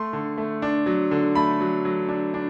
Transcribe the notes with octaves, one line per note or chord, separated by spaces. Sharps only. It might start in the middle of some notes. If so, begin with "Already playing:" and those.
Already playing: A3 C6
D3
A3
D4
F#3
D3
A3 B5
F#3
F#3
D4
D4